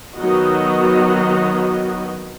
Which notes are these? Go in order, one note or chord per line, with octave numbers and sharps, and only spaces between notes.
D#3 F#3 B3 F#4 D#5